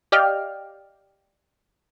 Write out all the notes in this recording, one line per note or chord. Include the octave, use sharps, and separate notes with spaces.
G4 D5 D#5 F5 G5 F6